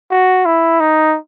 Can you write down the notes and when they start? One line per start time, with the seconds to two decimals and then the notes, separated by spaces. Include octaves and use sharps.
0.11 F#4
0.45 E4
0.80 D#4